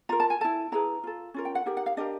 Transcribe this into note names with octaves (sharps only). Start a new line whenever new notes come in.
F4 A#4 A#5
A5
G#5
E4 A4 A5
E4 G#4 B4 A#5
F4 A4
C#4 F4 A#4
G5
F#5
D#4 G4 A#4 F#5
F#5
F5
D4 G4 A#4 D#5